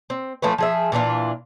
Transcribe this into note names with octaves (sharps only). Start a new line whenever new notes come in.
C4
F3 A3 C#4 B4
F3 G#4 E5
A#2 E3 D4 F4